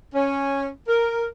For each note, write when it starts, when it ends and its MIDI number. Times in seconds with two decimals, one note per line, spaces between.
0.14 0.68 61
0.87 1.25 70